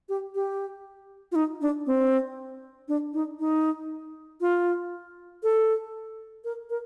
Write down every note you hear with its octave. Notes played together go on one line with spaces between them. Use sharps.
G4
G4
F4
D#4
D4
C4
D4
D#4
D#4
F4
A4
A#4
A#4